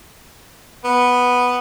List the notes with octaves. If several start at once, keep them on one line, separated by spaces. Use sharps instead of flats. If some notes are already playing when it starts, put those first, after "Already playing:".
B3